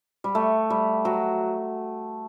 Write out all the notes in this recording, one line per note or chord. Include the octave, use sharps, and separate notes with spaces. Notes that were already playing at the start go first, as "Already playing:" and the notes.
G3
A3
G3
F#3